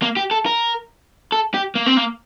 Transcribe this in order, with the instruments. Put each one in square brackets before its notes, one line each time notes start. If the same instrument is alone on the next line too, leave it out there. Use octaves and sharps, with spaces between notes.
[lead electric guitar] A#3
G4
A4
A#4
A4
G4
A#3
C4
A#3